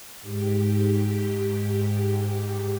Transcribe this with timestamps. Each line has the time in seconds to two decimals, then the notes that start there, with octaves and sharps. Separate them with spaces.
0.22 G#2 G4